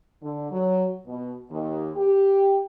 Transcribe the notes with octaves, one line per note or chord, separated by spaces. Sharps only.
D3
F#3
B2
D#2
G4